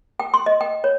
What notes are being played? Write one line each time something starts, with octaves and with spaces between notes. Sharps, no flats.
G5
C6
D#5
G5
C#5